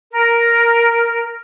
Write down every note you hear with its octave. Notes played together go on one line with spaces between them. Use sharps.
A#4